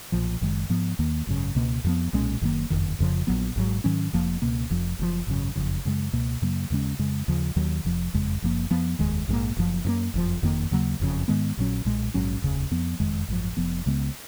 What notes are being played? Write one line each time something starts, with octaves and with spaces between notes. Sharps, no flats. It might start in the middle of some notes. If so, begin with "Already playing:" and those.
B1 A#2 F3
F#1 F#2 D#3 G#3
G#2 F3 B3
D#2 D#3 A#3
G#1 F#2 C#3
C#2 B2 A#3
F2 F3 B3
B1 A#2 G#3 C#4
F#1 F#2 D#3 A#3
F#1 F2 D#3
F1 F2 C#3 F3
A#1 A#2 F#3 B3
G#1 G#2 F#3
G#2 D#3 F#3 C#4
F1 F2 F3 A#3
C#2 B2 A#3
F1 F2 F3
F#1 F#2 C#3 F3
G#1 F#2 C#3
F#1 F2 C#3
F#2 C#3 G#3
C#2 B2 A#3
F#2 C#3 F#3 A#3
D#2 C#3 G#3 C#4
F2 C#3 G#3
D#2 C#3 F3
D#2 D#3 F#3
F1 F2 F3
F#1 F2 C#3 G#3
F#1 F#2 F3 A#3
F2 F3 B3
F1 D#2 D#3 G#3
A#1 G#2 D#3
A#3
F#1 F#2 F3
F#2 D#3 A#3
F#1 F2 F3
F#1 F2 D#3 A#3
D#2 C#3 F#3 A#3
F#1 F2 C#3
G#2 D#3 G#3 B3
A#1 A#2 F#3 C#4
B1 A#2 G#3
A#1 G#2 F#3 C#4
F1 D#2 C#3
F2 F3 B3
F#1 F2 D#3 G#3
G#1 F#2 F3
F1 F2 F3 B3
C#2 C#3 G#3 B3